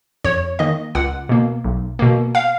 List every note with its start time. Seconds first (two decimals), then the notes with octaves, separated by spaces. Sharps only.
0.24 F2 C#5
0.59 D#3 A#3 D#5
0.95 C#2 F#5
1.29 B2 A#3
1.64 B1
1.99 B2 A#3
2.35 F5